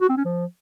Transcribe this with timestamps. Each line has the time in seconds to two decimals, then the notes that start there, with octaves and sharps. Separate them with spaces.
0.02 F#4
0.09 C4
0.17 C#4
0.25 F3